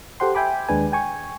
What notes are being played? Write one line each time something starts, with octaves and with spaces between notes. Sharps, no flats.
G4 A4 C5 F#5 G5 C6
E5 G5 G#5 B5 D6
D#2 G#3 D4 B4 G#5
G5 G#5 C#6